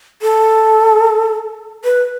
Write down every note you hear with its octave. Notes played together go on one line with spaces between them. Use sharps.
A4
B4